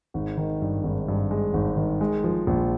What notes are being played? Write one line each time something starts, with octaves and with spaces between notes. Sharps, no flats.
G#1
D#3
G2
G#1
G2
G#3
G#1
D#3
G#3
F3
A#1